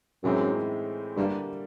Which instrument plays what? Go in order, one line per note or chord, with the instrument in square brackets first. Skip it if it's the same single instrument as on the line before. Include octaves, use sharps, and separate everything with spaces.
[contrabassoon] F#2 [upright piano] A2 E3 G#3 C4 D#4
[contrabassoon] G2 [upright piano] D3 G3 A#3